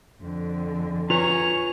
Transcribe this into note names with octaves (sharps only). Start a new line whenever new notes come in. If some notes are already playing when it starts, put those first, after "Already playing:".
F2 D3
F4 B4 C#5 G#5 A#5 C#6 F7